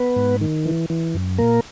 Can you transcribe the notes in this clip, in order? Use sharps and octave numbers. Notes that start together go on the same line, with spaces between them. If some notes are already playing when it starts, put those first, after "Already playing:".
Already playing: B3 B4
G#2
D#3
E3
E3
F#2
A#2 A#3 A#4